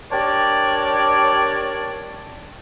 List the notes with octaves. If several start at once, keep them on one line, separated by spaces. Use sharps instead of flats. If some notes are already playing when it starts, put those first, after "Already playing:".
D4 G4 A#4 C#5 D5